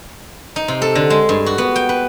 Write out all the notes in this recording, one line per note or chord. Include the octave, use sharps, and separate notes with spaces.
D#4
C3
A4
D3
G#3
G2
F#4
B3
G5
B4